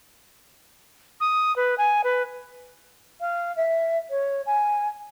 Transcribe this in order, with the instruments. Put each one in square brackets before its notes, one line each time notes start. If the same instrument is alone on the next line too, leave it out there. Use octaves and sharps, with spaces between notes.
[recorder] D#6
B4
G#5
B4
[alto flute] F5
E5
C#5
G#5